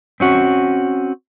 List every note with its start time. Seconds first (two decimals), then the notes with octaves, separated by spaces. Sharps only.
0.20 C4 C#4 F#4